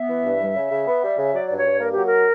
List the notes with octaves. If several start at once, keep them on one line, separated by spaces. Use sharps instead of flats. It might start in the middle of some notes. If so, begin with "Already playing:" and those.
Already playing: B3 E5
E3
G2
G3
C#3
C#3
B3
G3
C#3
F#3 D5
G2 D5
C#5
G2
A#3 A#4
F#3 G4
A#4